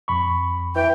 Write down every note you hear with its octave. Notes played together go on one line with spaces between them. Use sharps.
F2 B5 C#6
E3 G5